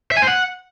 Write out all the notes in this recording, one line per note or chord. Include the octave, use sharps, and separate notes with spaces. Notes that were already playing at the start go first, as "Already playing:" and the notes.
E5
G#5
C5
F#5